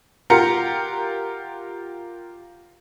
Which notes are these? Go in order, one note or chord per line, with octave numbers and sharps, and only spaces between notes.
F4 G4 A#4 F#5 A#5 C#7